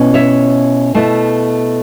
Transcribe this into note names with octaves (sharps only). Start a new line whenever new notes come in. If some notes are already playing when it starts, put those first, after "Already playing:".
Already playing: B2 C#4 E4
C#5 E5
B2 A3 E4